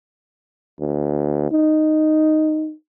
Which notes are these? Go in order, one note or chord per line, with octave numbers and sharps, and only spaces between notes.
D2
D#4